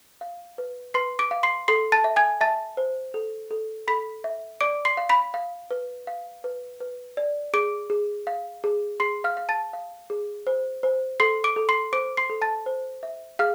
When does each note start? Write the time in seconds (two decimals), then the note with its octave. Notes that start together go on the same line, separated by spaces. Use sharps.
0.21 F5
0.58 B4
0.94 B4 C6 C7
1.19 D6 D7
1.31 F5
1.43 C6 C7
1.68 A4 C6 C7
1.92 A5 A6
2.04 E5
2.16 G#5 G#6
2.41 E5 A5 A6
2.77 C5
3.14 A4
3.51 A4
3.88 A4 B5 B6
4.24 E5
4.61 D5 D6 D7
4.85 C6 C7
4.97 F5
5.09 B5 B6
5.34 F5
5.71 B4
6.07 F5
6.44 B4
6.80 B4
7.17 D5
7.53 G#4 D6 D7
7.90 G#4
8.27 F5
8.64 G#4
9.00 G#4 C6 C7
9.24 F5 F6
9.37 F5
9.49 A5 A6
9.73 F5
10.10 G#4
10.47 C5
10.83 C5
11.20 A4 C6 C7
11.44 D6 D7
11.56 A4
11.69 C6 C7
11.93 C5 D6 D7
12.17 C6 C7
12.30 A4
12.42 A5 A6
12.66 C5
13.03 E5
13.39 G#4 F5 F6